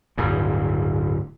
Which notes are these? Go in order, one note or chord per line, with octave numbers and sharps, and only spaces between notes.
D1 G2 C#3